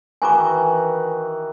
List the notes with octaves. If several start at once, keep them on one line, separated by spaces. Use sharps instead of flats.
D#3 E3 F#4 G#5 A#5 D6